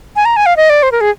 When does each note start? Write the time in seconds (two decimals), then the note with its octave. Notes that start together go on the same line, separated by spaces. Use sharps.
0.16 G#5
0.25 A#5
0.36 G#5
0.46 F5
0.57 D#5
0.70 D5
0.83 C5
0.92 A#4
1.01 G#4